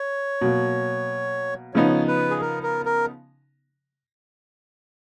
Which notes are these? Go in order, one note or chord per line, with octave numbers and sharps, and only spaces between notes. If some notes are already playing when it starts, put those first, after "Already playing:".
Already playing: C#5
B2 F#3 A#3
C#3 F3 B3 D#4 C#5
B4
G#4
A#4
A#4
A#4